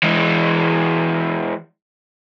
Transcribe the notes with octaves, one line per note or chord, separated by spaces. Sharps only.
E3 G#3